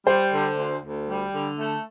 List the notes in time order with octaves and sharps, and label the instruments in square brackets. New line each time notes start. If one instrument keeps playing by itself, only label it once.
[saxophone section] G3 [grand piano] C5
[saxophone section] D3
D2
D2
G3
D3
A3